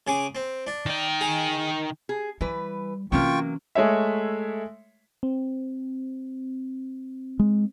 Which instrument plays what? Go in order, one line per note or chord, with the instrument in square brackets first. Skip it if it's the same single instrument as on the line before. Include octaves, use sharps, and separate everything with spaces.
[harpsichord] C#3 G#4 D6
C4
D4
[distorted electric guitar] D#3 G5
[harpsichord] G#4
[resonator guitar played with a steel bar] G#4
[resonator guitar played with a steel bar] E3 B4 [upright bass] G3
[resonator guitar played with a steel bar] C3 F#3 A#3 [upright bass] E3 C#4 [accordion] F4 G5 C#6
[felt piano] G#3 A3 C#5 E5
[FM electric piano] C4
[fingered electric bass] G#3